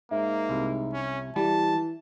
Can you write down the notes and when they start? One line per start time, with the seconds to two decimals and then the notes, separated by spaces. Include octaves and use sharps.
0.11 G#2 A#3 E5
0.49 C2
0.93 C#4
1.36 E3 G3 A5